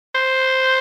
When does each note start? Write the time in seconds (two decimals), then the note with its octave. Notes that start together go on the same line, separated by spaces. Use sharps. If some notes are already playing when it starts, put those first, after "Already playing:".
0.15 C5